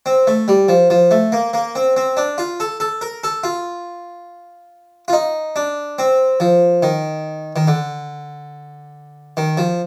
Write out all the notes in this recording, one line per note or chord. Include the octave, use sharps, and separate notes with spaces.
C4
A3
G3
F3
F3
A3
A#3
A#3
C4
C4
D4
F4
A4
A4
A#4
A4
F4
F4
D#4
D4
C4
F3
D#3
D#3
D3
D#3
F3